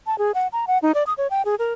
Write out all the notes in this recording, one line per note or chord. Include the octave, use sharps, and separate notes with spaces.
A5
G#4
F#5
A#5
F#5
D#4
D5
D#6
C#5
G5
G#4
A#4